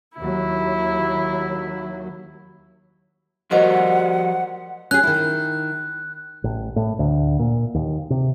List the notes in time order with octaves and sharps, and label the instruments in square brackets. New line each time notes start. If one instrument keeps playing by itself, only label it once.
[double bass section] D#2 F#3 [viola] E4
[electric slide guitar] F3 F#4 G4 [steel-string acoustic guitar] A#4 C5 D#5 [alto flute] F#5
[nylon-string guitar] C#4 G#4 [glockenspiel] F#6
[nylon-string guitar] D#3 E4
[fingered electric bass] A1
A2
D2
A#2
D#2
C3